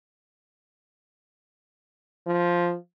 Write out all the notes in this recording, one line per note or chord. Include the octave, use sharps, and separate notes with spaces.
F3